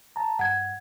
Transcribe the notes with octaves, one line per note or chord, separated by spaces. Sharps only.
A5 A#5
G2 F#5 G#6